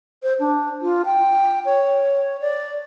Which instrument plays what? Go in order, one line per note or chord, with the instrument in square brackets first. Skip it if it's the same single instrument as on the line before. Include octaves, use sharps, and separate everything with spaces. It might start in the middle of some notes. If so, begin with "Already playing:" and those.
[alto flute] C5
D4
F4
G5
C#5
D5